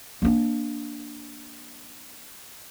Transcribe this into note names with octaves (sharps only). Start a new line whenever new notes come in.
A#3 D4